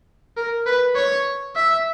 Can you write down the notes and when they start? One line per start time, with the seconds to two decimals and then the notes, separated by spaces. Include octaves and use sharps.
0.37 A#4
0.66 B4
0.96 C#5
1.56 E5